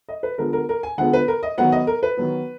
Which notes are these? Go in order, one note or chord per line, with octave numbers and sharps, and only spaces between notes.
D#5
B4
D3 F3 G#3 B3 A#4
A#4
A#4
G#5
D3 F3 G#3 B3 F#5
B4
A#4
D#5
D#3 F#3 B3 F#5
D#5
A#4
B4
D#3 F#3 B3